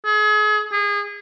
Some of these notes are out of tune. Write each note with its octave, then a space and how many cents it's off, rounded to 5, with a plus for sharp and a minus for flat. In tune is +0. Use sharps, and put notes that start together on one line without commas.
G#4 +35
G#4 -30